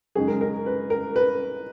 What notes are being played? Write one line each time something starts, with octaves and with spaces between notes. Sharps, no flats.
F#2 C#3 G#3 D#4 G#4
A#4
A#4
B4
A#4
B4